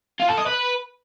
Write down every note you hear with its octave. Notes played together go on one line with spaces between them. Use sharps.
F4
A4
D#5
B4